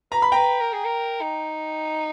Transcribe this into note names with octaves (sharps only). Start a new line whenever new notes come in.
B4 A#5
B5
B4 G5 A#5
A#4
G#4
A#4
D#4